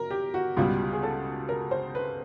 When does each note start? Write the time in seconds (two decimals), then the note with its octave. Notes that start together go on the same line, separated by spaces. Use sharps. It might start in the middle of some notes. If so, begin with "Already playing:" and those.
Already playing: F#3 A#4
0.11 G4
0.34 F#4
0.57 C#2 B2 G3 F4
0.93 G#4
1.03 A4
1.49 A#4
1.71 C5
1.95 B4